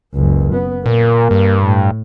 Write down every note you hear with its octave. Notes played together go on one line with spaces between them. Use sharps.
F#1 C#2
B3
A#2 A#3
G2
A2